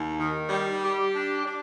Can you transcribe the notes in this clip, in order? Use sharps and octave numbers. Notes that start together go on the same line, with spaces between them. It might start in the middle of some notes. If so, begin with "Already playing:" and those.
Already playing: D#2
D#3
G3
G4
D4
D4